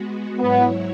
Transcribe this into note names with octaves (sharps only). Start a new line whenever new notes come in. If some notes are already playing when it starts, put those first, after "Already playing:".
Already playing: G#3 B3 F#4
G#2 F#3 B3 E4 C#5